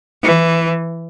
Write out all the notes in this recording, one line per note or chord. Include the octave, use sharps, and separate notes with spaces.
E3